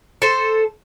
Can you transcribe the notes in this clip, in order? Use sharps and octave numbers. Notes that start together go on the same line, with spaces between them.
A4 C5